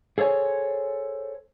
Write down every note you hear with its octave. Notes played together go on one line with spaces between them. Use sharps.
G#4 A4 C5 C#5 G#5